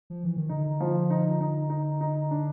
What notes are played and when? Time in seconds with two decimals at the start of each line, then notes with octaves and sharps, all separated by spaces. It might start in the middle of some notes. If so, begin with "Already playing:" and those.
0.10 F3
0.24 E3
0.37 D#3
0.49 D3 D#4
0.80 F3
1.10 D#4
1.40 D#4
1.70 D#4
2.01 D#4
2.31 D4